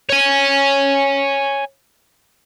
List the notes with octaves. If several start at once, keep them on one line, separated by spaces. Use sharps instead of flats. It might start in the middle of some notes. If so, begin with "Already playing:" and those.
C#5 G#5